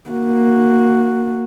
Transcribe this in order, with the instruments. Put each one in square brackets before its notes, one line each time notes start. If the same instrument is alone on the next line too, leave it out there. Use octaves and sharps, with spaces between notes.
[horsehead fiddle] A#3 F#4